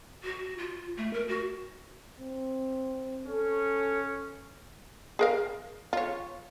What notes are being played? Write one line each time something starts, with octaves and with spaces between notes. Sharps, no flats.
F#4
F4
A3
A#4
F#4
C4
C#4 A4
G#4 A#4 F5
F4 C#5